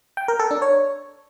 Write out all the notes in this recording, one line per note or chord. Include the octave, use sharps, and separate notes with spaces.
G5
A#4
A4
D4
C#5